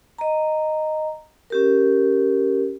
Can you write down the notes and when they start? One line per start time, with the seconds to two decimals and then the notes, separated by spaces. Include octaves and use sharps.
0.18 D#5 A#5
1.50 C#4 G4 A#4